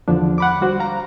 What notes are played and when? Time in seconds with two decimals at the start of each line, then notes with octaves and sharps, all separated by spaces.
0.08 E2 D3 F3 D4
0.38 F#5 B5 D6
0.61 G3 F#4 C5
0.80 F5 A#5